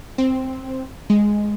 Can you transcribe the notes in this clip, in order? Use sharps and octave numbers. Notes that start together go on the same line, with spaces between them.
C4
G#3